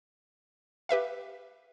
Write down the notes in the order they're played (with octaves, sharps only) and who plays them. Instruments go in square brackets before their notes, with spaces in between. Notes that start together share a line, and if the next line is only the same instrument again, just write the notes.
[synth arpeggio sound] G4 B4 E5 F5